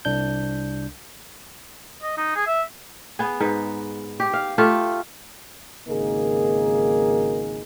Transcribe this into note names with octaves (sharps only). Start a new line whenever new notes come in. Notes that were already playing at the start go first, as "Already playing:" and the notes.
C2 D4 G6
D#5
D#4
G#4
E5
B3 G#4
G#2 D#4 B4
G4
F5
A3 F4 G4
G#1 C#3 A#3 D#4 G#4 A#4